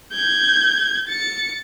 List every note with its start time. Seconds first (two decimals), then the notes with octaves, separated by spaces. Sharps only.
0.12 G6 G#6
1.08 A6 C#7